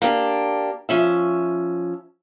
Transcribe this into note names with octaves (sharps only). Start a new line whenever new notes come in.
A#3 D4 G4
F3 C#4 E5